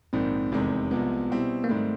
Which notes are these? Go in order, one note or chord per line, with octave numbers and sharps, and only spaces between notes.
A#1 G#2 D#3 C4
F1 E2 C3 D#3 G#3
C2 C3 F3 G#3 B3
B2 G3 C4 E4 G4
A#3
G#2 D#3 G3 A3 C4